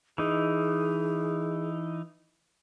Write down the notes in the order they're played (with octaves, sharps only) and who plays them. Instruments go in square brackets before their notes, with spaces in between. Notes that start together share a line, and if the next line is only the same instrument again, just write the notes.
[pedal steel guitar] E3 D#4 [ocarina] G#4